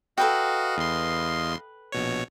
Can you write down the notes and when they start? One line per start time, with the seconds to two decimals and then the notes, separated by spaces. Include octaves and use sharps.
0.17 F#4 A4 B4 D#5 F5 G5
0.77 E2 C6
1.92 A#1 B2 C#5